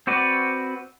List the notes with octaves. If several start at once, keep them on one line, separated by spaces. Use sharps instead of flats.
C4 F#4 B4 D5